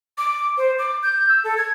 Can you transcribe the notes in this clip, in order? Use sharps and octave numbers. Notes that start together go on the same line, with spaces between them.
D6
C5
D6
G6
E6
A4
G#6